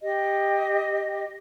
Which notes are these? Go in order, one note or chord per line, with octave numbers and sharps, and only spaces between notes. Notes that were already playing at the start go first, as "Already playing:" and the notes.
G4 D#5